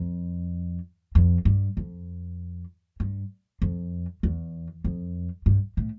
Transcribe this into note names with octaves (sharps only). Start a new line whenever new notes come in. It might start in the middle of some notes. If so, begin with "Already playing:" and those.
Already playing: F2
F2
G2
F2
G2
F2
E2
F2
G2
A2